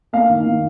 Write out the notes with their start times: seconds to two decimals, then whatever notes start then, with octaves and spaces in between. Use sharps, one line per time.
0.13 A#3 F5
0.29 D#3
0.45 A#3